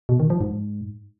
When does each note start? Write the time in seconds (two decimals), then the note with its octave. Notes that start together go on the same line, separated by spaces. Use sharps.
0.09 B2
0.20 D#3
0.30 F3
0.41 G#2